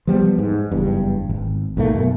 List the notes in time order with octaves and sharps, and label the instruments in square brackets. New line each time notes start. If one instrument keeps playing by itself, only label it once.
[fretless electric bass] F3 G3 B3
G#2
F#1 E2 G2
G#1
B1 G#2 A3 A#3
F#2 B2